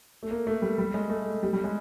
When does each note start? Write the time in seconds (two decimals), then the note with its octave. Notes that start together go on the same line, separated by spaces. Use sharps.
0.23 A3
0.31 A#3
0.47 A3
0.62 G3
0.78 G3
0.94 G#3
1.10 A3
1.43 G3
1.53 G3
1.64 G#3